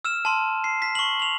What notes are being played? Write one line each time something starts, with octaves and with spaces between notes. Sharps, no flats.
E6 F6 E7
A5 C6
C7
B6
C#6 F#7
F7 F#7